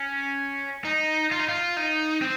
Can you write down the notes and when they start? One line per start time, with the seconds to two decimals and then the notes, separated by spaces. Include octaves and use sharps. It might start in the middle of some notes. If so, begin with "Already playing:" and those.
Already playing: C#4
0.85 D#4
1.31 F4
1.40 D#4
1.49 F4
1.77 D#4
2.21 C4